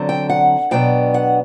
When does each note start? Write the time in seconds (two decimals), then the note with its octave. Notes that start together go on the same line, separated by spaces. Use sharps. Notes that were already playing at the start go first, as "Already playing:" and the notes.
Already playing: D3 F#3 C4
0.09 G5
0.30 F#5
0.71 B2 F#3 B3 D4 G5
1.14 F#5